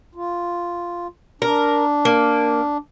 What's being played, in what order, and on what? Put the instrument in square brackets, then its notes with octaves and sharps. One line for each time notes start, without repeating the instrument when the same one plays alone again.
[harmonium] F4
[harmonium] D4 [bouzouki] A#4
[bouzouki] A#3